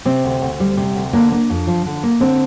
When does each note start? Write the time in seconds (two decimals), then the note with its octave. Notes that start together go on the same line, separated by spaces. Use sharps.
0.05 C3 C4
0.24 D2
0.42 D2
0.60 G3
0.77 C3
0.95 D2
1.13 D3 A#3 D4
1.32 A#3
1.50 F2
1.67 F3
1.86 D3
2.03 A#3
2.20 D3 C4